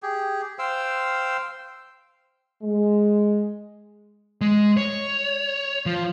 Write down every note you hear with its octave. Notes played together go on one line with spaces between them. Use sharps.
G4 G#4
C5 F5 G5 E6
G#3
G#3
C#5
F3